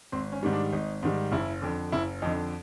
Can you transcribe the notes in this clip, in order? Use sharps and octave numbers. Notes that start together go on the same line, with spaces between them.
G#1 C4
C#4
G#2 D#3 G3
D4
G#1 D#4
G#2 D#3 G3
F#1 E4
F2 D3
F#1 E4
F2 D3 D#4